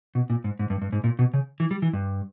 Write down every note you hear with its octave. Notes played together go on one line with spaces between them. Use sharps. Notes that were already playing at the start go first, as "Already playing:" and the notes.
B2
A#2
G#2
G#2
G2
G2
G#2
A#2
B2
C#3
E3
G3
E3
G2